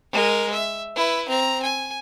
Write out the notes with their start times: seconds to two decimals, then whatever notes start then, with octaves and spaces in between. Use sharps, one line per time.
0.12 G#3 A#4
0.53 E5
0.96 E4 B4
1.29 C4 A#5
1.63 G#5